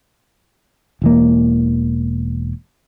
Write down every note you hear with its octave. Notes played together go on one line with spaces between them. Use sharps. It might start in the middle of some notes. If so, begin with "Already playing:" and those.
E1 E3 A#3